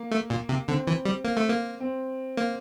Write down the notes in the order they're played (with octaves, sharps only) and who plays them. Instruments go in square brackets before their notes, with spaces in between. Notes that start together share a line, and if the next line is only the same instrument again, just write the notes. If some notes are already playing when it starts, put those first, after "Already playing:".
Already playing: [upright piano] A#3
[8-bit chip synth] A3
A#2
C3
[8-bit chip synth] D3 [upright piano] C4
[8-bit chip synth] E3
G3
A#3
A3
A#3
[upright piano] C4
[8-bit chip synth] A#3